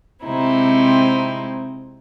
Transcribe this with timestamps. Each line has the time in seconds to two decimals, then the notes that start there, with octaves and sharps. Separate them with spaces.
0.23 C3 G#3 C4 D#4 E4